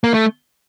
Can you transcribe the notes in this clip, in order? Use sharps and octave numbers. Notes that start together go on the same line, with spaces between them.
A#3
A3